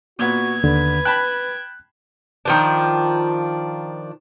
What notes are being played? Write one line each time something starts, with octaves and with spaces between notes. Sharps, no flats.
A#2 B3 F#4 G#6
D#2 D3 B4
G5 A5 B5 F#6
D#3 F3 D4